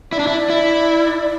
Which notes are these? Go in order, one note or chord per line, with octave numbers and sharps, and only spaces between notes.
E4 D5
D4
E4
E4